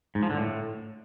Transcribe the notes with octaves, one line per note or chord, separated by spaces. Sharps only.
G#2
F3
D3
A2